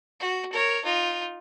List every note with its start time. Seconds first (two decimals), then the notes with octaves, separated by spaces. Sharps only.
0.20 F#4
0.52 A#4 C#5
0.84 D#4 F4